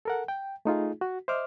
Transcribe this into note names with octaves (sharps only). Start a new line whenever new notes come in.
A4 A#4 F#5
G5
A3 D#4 F4 G#4
F#4
C5 D#5 E5 D6 F6